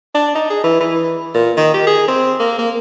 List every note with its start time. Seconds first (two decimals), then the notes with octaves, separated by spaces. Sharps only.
0.15 D4
0.35 D#4
0.50 G#4
0.64 E3
0.81 E3
1.34 A#2
1.57 D#3
1.74 G4
1.87 G#4
2.08 C4
2.40 A#3
2.59 A#3